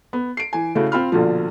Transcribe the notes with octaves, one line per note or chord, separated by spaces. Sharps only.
B3
C7 D7
E3 G#5
C#3 A3 E4 F#4
C4 F4 B5 F6
A#1 B2 D3 F3